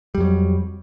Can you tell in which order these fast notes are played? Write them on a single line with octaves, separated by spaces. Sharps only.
G3 F2 F#3